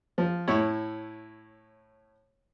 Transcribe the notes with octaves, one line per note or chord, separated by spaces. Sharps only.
F3
A2 E4 C#5